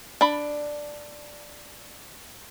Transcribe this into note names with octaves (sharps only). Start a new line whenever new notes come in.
D4 B5